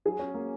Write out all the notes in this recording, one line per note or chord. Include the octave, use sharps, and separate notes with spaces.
F#3 G#4
C#4
A#3